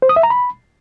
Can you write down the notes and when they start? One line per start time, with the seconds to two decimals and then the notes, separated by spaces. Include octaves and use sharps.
0.02 C5
0.09 D#6
0.16 E5
0.23 A#5
0.30 B5